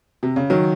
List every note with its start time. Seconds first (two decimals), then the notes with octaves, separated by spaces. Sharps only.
0.23 C3
0.36 C#3
0.50 D#3 F#3